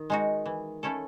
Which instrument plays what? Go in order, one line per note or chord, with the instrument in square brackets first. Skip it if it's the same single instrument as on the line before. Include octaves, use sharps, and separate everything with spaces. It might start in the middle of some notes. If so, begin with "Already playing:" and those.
Already playing: [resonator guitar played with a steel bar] D#3
[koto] G#3 D#4 F#4
E3
A3 C#4 E4 A4